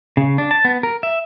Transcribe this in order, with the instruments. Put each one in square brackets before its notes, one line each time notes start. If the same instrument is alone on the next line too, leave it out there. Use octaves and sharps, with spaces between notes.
[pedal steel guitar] C#3
D4
A5
B3
A#4
E5